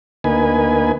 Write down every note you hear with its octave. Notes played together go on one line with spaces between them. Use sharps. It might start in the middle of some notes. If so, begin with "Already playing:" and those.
D2 A#3 D#4 B4 G#5